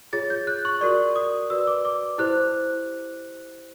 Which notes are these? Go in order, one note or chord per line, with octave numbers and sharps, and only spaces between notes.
F4 G#4 C#5 A6
G6
F#6
C#6
F#4 A#4 D5 C#6
D#6
F#4 B4 D5 E6
D6
D6
E4 G4 C5 F#6